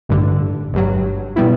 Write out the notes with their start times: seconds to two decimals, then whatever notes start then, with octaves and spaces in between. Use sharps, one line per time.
0.09 A1 G2 D3
0.73 G1 G2 F#3
1.36 B2 G3 B3 E4